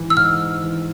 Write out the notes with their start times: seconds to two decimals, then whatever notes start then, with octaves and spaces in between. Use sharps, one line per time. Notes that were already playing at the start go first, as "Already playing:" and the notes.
Already playing: G#2 E3
0.10 E6
0.17 G#2 F6
0.63 E3